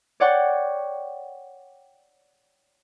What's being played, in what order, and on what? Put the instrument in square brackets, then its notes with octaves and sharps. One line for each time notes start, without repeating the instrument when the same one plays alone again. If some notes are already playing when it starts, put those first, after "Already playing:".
[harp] C#5 D5 F#5 G5 C#6